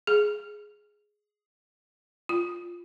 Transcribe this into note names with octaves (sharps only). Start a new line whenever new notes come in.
G#4
F4